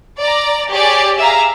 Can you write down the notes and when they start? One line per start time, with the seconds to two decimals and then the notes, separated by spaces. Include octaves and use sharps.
0.21 D5 A#5
0.70 G4 G#4 C#5 D5
1.18 G#4 E5 F5 A#5